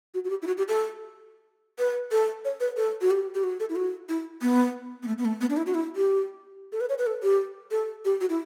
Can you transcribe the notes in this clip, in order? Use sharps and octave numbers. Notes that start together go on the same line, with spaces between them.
F#4
F#4
G4
E4
F#4
G4
A4
B4
A4
C#5
B4
A4
F#4
G4
G4
F#4
A4
E4
F#4
E4
B3
B3
A3
B3
A3
B3
D4
E4
F#4
E4
G4
A4
B4
C#5
B4
A4
G4
A4
G4
F#4
E4